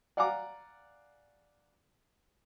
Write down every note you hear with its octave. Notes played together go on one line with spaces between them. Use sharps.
D5 F5 F#5 G#5 A#5 D6